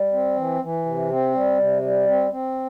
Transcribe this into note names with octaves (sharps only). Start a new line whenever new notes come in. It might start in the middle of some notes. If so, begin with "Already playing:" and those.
Already playing: G3
C4
E3
E3
C3
C4
G3
C3
G3
C4
C4